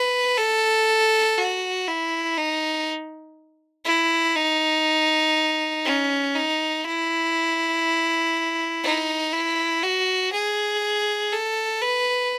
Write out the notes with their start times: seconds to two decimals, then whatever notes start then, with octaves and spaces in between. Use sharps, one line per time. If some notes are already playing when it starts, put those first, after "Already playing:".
Already playing: B4
0.37 A4
1.38 F#4
1.87 E4
2.37 D#4
3.85 E4
4.36 D#4
5.85 C#4
6.35 D#4
6.84 E4
8.83 D#4
9.33 E4
9.82 F#4
10.32 G#4
11.32 A4
11.82 B4